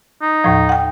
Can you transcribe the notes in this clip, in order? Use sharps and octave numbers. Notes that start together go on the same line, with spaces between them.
D#4
D#2 A2 F3
F#5 G5